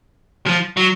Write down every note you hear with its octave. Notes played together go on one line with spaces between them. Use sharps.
F3
F#3